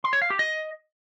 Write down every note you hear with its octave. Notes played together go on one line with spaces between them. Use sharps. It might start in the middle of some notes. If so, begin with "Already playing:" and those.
C6
C#5
F5
G4
D#5